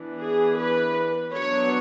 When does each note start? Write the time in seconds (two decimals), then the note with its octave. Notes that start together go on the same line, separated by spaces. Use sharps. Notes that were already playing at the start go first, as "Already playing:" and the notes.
Already playing: E3 B3 D4
0.21 G#4
0.59 B4
1.33 F#3 B3 D4 C#5